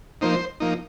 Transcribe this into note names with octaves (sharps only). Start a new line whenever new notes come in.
F3 A#3 D#4 C5
F3 A#3 D#4